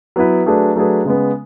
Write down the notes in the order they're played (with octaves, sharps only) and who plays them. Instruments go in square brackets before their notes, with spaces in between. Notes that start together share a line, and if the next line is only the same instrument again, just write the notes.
[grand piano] F#3 B3 E4 B4
F#3 A3 D4 G#4 B4
F#3 A3 D4 G#4 B4
C#3 G#3 B3